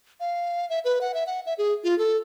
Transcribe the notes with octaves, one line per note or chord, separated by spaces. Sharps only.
F5
E5
B4
F#5
E5
F#5
E5
G#4
F4
A4